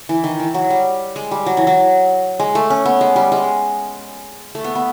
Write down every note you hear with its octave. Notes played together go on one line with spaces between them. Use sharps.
E3
D#3
E3
F#3
G3
G#3
G3
F#3
E3
F#3
G#3
A3
C#4
B3
G#3
G3
G#3
A3
B3
B3